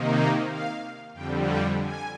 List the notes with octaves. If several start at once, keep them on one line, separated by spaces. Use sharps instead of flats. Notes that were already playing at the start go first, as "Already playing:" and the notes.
Already playing: C3 D#3 A#3 D#4
F5
F2 D3 G3 G5
G5
G#5